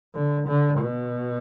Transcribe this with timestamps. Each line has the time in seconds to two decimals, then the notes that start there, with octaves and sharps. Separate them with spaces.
0.15 D3
0.47 D3
0.79 B2